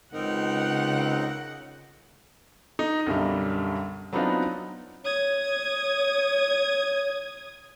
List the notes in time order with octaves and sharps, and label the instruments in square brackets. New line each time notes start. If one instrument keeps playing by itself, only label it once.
[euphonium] C#2 [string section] C#3 [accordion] C4 D#4 A#4 [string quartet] F#5
[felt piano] D#4
B1 F#2 D3 G3
F#3 B3 C4 D4 D#4 F4
[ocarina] C#5 [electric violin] D#6 G#6